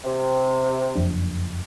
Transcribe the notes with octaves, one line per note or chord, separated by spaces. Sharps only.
C3
F#1 F2 D4